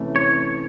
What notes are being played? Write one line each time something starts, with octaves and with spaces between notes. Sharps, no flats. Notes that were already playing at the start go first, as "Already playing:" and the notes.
Already playing: C3 E3 A3 C#4
C#5